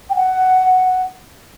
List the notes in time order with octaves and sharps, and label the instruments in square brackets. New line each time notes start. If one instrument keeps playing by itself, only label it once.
[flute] G5
F#5